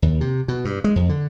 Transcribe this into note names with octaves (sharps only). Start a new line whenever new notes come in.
D#2
C3
B2
G2
G#3
F2
D3